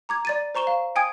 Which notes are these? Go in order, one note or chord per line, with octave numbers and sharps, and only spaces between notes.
A#5 D6 G#6
D5 A6 D#7
C5 A#5 C#6 E7 G7
F5
G5 G#5 D#6 G#6